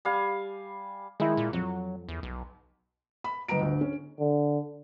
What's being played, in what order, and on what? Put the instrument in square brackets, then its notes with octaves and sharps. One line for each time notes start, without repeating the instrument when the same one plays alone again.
[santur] G3 F5 G#5
[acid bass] D#3 [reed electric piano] G#3 E4
[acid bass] A#2
[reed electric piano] F2 [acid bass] F#3
[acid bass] E2
B1
[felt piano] B5
G1 B4 D#5 A#5 D7
D2
C#4
[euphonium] D3